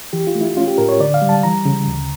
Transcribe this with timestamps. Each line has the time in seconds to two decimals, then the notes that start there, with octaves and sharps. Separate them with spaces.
0.13 E3 G4
0.27 F4
0.35 A3
0.41 E4
0.57 C#4 F4
0.67 G4
0.78 A2 A#4
0.89 C#5
1.00 D3 D5
1.14 F5
1.22 G3
1.29 A5
1.43 E3 A#5
1.65 C#3
1.87 D2